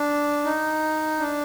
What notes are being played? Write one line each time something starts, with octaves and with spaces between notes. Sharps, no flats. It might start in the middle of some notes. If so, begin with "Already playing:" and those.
Already playing: D4
D#4
D4